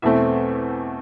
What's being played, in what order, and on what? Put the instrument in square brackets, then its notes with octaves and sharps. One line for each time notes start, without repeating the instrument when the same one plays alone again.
[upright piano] E2 B2 A3 C4 E5